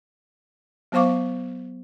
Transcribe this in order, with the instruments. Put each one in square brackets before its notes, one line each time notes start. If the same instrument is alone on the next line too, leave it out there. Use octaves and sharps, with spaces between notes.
[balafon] F#3 B3 C5 F5 C#6 D6